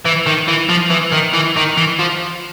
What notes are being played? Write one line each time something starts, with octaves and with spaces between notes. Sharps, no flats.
E3
D#3
E3
F3
E3
D#3
E3
D#3
E3
F3